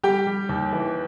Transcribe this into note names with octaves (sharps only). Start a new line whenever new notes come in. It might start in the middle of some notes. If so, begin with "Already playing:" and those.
G3 G4 G5
G3
D#2
E3